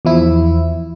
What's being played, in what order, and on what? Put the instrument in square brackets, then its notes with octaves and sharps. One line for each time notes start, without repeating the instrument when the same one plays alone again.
[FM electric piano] E2 F3 E4